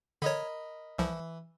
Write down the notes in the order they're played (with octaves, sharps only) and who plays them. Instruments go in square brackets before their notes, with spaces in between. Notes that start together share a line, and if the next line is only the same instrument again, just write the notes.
[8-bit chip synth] D3 C#5 [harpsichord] A#4 D#5 B5
[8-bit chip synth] C2 F3 [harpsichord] E3